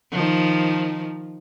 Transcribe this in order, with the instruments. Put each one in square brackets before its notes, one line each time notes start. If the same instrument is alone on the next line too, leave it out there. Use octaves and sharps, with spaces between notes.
[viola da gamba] D#3 F3